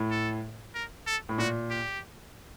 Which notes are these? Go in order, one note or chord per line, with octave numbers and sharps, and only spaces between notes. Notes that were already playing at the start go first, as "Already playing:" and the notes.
Already playing: A2
A4
A#4
A4
A2
A#2 F#4
G4